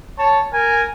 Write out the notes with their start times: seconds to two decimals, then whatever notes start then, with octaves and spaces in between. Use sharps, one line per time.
0.18 C#5 A5
0.53 A#4 G#5